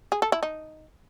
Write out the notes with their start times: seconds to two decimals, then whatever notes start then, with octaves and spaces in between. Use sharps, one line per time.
0.12 G#4
0.22 A4
0.32 E4
0.43 D#4